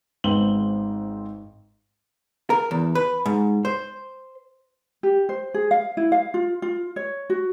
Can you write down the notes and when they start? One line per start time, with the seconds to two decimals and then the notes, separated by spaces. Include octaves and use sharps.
0.24 G#1 G#2 B3 C4 F#7 G7
2.50 A#4
2.71 E2
2.95 B4
3.26 G#2
3.65 C5
5.03 G4
5.29 C5
5.54 G#4
5.71 F5
5.97 E4
6.12 F5
6.34 F4
6.62 F4
6.96 C#5
7.30 F#4